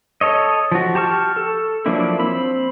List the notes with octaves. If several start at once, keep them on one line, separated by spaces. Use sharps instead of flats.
A4 C#5 D#5
F3 F#4
G4 A5 C#6 F6
A4
F3 F#3 A#3 D4 E4
C4 B5 E6